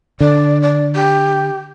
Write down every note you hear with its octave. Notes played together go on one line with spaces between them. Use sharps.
D3 D5
D5
G4